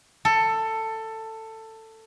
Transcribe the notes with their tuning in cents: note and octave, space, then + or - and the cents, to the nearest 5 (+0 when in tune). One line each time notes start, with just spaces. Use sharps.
A4 +15